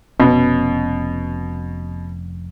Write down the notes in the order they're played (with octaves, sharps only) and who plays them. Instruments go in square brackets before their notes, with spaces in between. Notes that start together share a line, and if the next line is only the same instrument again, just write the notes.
[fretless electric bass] F1 C#4 [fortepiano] B2